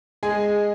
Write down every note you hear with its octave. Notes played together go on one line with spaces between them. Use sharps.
G#3 G#4 G#5